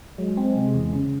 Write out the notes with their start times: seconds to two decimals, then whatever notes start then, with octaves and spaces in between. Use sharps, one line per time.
0.18 F#3 G#3
0.37 C4
0.56 C3
0.74 E2
0.93 C#3